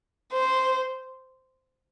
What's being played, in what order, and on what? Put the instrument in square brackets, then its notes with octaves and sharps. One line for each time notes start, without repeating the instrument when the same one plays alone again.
[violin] C5